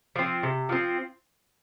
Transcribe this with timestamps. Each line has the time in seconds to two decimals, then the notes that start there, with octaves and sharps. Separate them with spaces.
0.16 F3 C4
0.43 C3
0.69 F3 C4